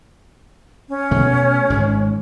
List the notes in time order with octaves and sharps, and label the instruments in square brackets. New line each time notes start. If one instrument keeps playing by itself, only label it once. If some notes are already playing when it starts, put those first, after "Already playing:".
[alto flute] C#4
[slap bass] B2 A3
G#1 G#2 G#3